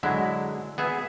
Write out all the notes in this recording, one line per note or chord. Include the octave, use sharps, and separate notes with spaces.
D3 F#3 G#3 E4
B3 G#4 E5